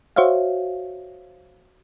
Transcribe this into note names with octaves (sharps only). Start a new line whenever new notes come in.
F#4 C5 C#5 E5 F5